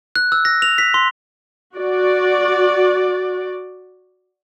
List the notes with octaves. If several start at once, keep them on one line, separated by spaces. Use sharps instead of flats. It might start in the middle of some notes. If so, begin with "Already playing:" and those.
F#6
E6
A#6
F7
B6
C6
F#4 D5